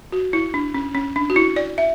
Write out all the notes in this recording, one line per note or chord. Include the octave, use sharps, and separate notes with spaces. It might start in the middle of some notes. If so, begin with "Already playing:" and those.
F#4
E4
D4
C#4
C#4
D4
F#4
E4
D5
E5